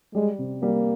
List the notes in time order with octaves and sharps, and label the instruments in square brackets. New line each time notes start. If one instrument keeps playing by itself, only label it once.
[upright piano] G3 [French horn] G#3
[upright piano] C3
[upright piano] G3 [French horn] A#3